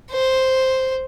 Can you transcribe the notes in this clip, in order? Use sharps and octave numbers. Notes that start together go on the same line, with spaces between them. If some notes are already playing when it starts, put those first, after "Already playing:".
C5